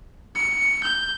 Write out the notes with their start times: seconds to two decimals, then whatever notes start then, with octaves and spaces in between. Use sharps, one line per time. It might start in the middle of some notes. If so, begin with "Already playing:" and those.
0.35 C#7
0.84 G6